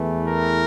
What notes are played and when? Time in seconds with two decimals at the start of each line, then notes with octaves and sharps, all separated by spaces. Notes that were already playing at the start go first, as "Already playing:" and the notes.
Already playing: E2 E3 A3
0.26 A#4